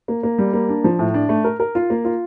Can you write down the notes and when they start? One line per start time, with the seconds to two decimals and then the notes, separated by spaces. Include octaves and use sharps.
0.08 A#3
0.23 A#3
0.38 G3
0.53 A#3
0.69 D4
0.84 F3
0.99 A2
1.14 D4
1.29 A3
1.44 A#4
1.60 A#4
1.75 F4
1.90 A#3
2.05 F4